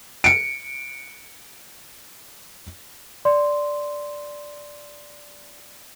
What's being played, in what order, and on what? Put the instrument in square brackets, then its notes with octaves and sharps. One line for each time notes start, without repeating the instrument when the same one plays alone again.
[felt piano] C#7 D7
[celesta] D5 C6